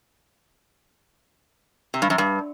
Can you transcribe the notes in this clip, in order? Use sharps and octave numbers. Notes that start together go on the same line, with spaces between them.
C3
G2
F#2
G2